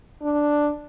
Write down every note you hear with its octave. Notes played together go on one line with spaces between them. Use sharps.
D4